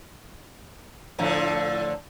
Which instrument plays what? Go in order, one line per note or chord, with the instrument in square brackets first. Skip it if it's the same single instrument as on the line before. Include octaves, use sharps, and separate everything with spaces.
[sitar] A2 D3 F3